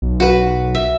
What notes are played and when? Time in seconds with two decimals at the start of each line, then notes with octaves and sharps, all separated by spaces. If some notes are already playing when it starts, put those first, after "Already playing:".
0.02 B1
0.20 F#4 B4
0.75 E5